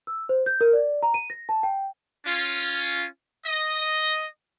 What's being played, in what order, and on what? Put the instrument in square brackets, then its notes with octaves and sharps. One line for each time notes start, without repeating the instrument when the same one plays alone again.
[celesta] E6
C5
G6
A#4
D5
A#5
D#7
A#6
A5
G5
[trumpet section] C#4 F4
D#5